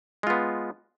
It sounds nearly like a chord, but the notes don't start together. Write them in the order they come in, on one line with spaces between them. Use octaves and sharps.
G#3 F4 B3